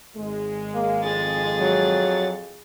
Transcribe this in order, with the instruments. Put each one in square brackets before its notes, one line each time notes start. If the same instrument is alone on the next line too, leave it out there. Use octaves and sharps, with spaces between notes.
[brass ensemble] G#1 G#3
[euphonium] A#3
[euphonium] F2 [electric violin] G#4 A6
[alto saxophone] F#3